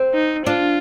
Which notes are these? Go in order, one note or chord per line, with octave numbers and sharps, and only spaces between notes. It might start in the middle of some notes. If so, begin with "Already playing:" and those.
Already playing: C4
D#4
D4 F4